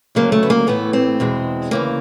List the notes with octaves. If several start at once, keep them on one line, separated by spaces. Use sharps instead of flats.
D2 C#3 F#3 A#3
A3
B3
A#3
A2 E3 A3 B3
C4
E2 B2 G#3
D2 C#3 E3 A#3